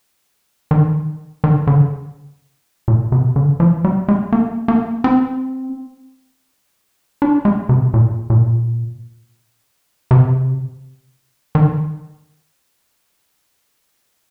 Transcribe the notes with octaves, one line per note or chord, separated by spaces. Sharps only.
D#3
D#3
D3
A#2
C3
D3
F3
G3
G#3
A#3
A#3
C4
D4
G#3
C3
A#2
A#2
C3
D#3